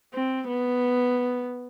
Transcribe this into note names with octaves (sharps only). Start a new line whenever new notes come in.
C4
B3